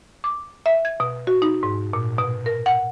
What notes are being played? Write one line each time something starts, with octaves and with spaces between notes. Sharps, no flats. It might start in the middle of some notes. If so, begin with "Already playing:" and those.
D6
E5
G#6
B2
F#4
D#4
G#2
A#2
B2
A#4
F#5